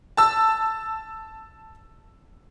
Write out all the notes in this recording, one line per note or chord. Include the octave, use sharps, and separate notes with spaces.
A5 E6